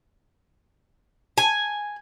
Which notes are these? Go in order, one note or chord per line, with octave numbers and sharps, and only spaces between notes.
G#5